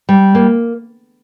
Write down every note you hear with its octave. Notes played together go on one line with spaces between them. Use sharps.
G3
A#3